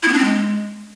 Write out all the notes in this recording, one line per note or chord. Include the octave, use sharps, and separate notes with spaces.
E4
B3
D4
C4
G#3